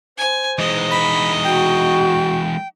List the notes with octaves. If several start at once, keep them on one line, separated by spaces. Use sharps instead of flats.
C5 G#5
E3 G#3 D#4 D#5
B5
F#4 G5